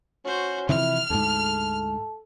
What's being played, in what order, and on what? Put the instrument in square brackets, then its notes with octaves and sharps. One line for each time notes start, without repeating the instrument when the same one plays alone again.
[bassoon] C#4 [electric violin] F#4 C5
[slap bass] C3 E3 F3 [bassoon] E4 [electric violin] F6
[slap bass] D2 G#2 [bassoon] A4